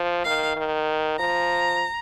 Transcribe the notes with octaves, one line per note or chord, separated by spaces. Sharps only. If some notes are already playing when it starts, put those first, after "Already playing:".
Already playing: F3
D#3 F5
D#3
F3 A#5